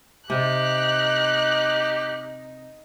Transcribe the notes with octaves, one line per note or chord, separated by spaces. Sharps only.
C3 D#4 G4 F#6